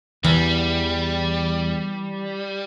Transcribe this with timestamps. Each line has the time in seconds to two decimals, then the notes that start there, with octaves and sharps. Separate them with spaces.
0.24 E2 E3 G3